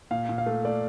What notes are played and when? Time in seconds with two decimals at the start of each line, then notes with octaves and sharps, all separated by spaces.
0.11 A#2 F5
0.29 A#2
0.38 F5
0.46 A3
0.65 A3 D5